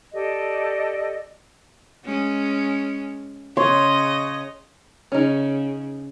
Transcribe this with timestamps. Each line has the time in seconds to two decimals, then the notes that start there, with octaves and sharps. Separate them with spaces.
0.13 G4 A4 D5 D#5
2.05 G#3 C#4
3.57 C#3 C#5 D#5 C6
5.12 C#3 C#4 D#4